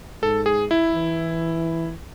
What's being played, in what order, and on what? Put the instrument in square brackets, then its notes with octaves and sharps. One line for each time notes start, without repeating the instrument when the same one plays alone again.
[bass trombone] G#2 [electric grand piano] A4
[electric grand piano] G#4
E4
[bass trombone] E3